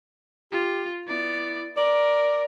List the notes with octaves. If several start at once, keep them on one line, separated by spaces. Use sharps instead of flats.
F4 G4
B3 E4 D5
A#4 D5